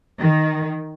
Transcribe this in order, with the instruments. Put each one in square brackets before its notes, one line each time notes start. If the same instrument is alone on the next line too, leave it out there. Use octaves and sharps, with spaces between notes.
[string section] D#3